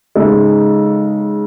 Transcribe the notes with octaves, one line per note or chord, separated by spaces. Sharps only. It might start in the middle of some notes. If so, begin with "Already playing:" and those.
C#3 G#3 D#4 A4